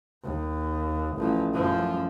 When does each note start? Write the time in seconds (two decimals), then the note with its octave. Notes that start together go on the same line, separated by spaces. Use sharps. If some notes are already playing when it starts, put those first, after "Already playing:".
0.24 D#2
1.17 A1 F3
1.54 F#2 F3